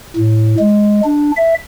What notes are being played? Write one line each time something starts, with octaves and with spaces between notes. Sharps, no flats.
A2
G#3
D4
E5